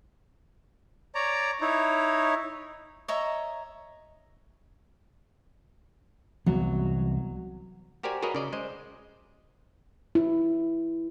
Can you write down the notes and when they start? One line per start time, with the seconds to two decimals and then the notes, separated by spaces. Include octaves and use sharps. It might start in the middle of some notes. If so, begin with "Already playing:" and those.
1.15 C#5 D5 A#5
1.61 D#4 E4 C#5
3.08 C#5 D#5 E5 A#5
6.46 C2 E3 F#3 B3
8.03 F#4 G4 A#4 C5 D5 G#5
8.22 F#4 G#4 A#4 B4 C#5 D#5
8.35 C#3 D5 D#5
8.53 G#3 C5 D#5
10.15 E4